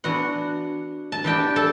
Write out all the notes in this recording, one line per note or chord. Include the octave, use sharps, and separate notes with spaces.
E3 B3 D4 F#4 F#5
A5
E3 B3 D4 G4 G5
A4 A5